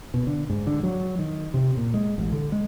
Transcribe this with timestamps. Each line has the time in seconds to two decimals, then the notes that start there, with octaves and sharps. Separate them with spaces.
0.14 B2
0.27 D3
0.50 G#2
0.67 D3
0.83 F#3
1.19 D#3
1.54 C3
1.77 A#2
1.94 G#3
2.18 A1
2.32 D3
2.52 G#3